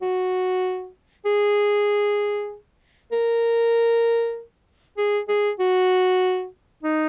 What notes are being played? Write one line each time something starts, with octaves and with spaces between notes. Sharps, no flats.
F#4
G#4
A#4
G#4
G#4
F#4
D#4